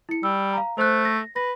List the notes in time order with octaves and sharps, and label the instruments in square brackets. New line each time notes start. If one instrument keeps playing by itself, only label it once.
[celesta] E4 C#7
[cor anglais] G3 [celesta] E6
[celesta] F5 A#5
[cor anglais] A3 [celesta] C5 F#6
[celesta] A#6
[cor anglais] B4 [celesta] A#6